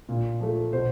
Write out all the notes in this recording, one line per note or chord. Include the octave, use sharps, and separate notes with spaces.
A#2
F3 A3
B2 C5